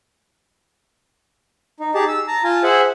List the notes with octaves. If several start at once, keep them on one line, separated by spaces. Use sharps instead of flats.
D#4
D#4 G4 G#4 A5
E6
A5 A#5
F4 G#5 A5
G#4 C5 E5 F#5 G#5